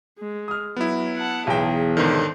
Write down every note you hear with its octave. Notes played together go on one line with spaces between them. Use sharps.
G#3
D#6 F6
F#3 B3 E4
F#5 A5
B1 E2 G#4 G5
G#2 D3 D#3 C5